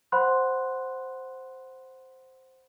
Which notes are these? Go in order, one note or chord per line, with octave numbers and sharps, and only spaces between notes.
C5 F#5 B5 C6 F#6